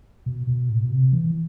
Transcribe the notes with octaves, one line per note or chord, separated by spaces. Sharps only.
B2
B2
A2
B2
C3
E3